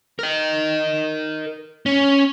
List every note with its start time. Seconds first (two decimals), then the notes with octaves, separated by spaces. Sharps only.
0.19 A#4 D#5
1.86 C#4